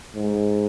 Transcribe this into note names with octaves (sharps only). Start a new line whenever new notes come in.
G#2